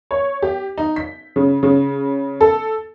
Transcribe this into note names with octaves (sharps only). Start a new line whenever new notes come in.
C#5
G4
D#4
B6
C#3
C#3
A4